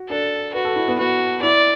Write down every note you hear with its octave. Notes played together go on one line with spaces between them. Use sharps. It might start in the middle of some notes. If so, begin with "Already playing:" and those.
Already playing: F#4
D4 A4
F#4 B4
A4
E4
B3
B3 F#4
E4 D5